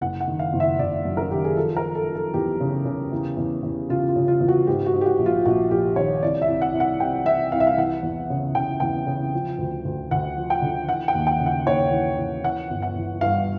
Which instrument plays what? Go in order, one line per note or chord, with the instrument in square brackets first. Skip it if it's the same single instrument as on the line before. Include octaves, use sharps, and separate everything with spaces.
[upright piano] F#1 F#5
F#5
D#3
F5
F#1
E5
F#1 D5
F#2
A#4
D#3 G4
G#4
F3 A4
A#4
F3
A4
F3
A4
E2 G4
C#3
C#3
E2
E2
E2
C#3 F4
F4
C#3
F4
E2
F#4
G#2 G4
F#4
G#2
G4
F#4
A#1
F4
A#1 F#4
A#1 G4
D#3 C#5
C2 D5
E5
C2
F#5
C2
F#5
C3 G5
E3 E5
C2 F5
E5
F5
E3 F#5
E2
C#3
C#3 G5
E2 G5
C#3
F3
D2
D2
D2 F#5
F3
G5
D3
E3 F#5
G5
D#2
G5
C#3
F#5
D#2 C#5
E3
E3
E3 F#5
G1
F#5
E3
G2 F5